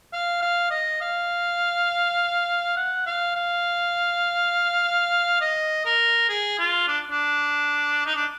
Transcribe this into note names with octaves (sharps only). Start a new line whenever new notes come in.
F5
F5
D#5
F5
F#5
F5
F5
D#5
A#4
G#4
F4
D4
D4
D#4
D4